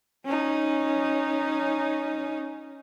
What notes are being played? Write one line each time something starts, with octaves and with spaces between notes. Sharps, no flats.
C#4 D#4